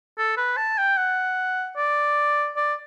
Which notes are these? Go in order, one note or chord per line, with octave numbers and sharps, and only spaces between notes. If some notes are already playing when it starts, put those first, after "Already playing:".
A4
B4
A5
G5
F#5
D5
D5